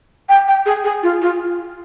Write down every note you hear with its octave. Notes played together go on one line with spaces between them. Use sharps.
G5
G5
G#4
G#4
F4
F4